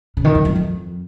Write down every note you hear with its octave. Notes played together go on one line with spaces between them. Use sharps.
C#3
D#3
F2
F2
F2